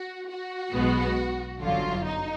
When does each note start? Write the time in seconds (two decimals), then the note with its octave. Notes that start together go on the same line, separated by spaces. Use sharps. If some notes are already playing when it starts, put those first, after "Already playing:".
Already playing: F#4
0.30 F#4
0.73 B1 B2 G#3 B3
1.61 G1 F#2 D3 F#3 F4
2.06 D#4